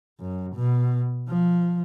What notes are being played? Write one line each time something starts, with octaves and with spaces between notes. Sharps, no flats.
F#2
B2
F3